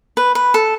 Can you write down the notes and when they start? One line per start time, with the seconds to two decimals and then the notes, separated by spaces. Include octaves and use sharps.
0.17 B4
0.35 B4
0.54 A4